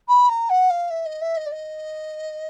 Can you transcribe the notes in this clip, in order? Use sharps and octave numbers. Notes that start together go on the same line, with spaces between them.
B5
A#5
F#5
F5
E5
D#5
E5
D#5
D5
D#5